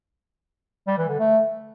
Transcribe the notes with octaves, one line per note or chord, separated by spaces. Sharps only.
G3
E3
D3
A3